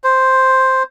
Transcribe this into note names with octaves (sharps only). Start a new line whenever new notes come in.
C5